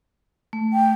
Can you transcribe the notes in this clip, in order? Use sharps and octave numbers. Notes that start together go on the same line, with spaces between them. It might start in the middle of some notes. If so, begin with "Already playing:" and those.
A3
G5